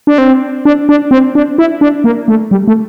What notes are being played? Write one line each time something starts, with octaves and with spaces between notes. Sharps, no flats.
D4
C4
D4
D4
C4
D4
E4
D4
A#3
A3
G3
A3